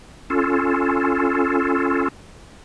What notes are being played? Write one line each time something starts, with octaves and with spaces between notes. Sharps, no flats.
C#4 F4 A4